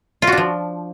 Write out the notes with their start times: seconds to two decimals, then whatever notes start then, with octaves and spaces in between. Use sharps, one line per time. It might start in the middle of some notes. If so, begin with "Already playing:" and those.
0.22 F4
0.27 F#4
0.32 D4
0.37 F3